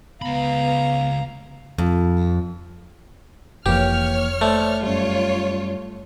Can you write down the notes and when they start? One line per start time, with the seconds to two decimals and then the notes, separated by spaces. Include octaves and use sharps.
0.22 C#2 B3 F5 A#5 B5
1.78 F2
3.66 F1 F2 E3 A#3 G4 C#5 F6
4.41 A3 C5 D5
4.83 F#2 G3 F4 C#5